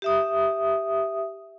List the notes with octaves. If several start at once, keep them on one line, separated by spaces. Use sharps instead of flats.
G4 E5 D#6